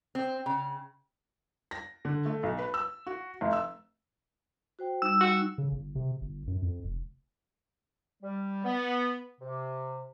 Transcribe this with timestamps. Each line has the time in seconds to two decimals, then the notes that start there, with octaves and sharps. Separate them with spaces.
0.15 C4
0.46 C#3
1.71 A#6
2.05 D3
2.26 A3
2.43 B1
2.59 B4
2.74 E6
3.07 F#4
3.41 F1
3.53 E6
4.79 F#4 C5 G5
5.02 G3 D#4 E6
5.20 F#4
5.58 C#3
5.72 G1
5.95 C3
6.21 G1
6.47 F#2
6.62 F2
6.84 F1
8.21 G3
8.64 B3
9.40 C3